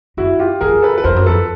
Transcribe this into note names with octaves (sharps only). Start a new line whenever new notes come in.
F#2 E4 F#4
F4 G4
F2 G#4 A#4
A4 B4
B4
F2 A#4 C5
F#2
F2 A4 B4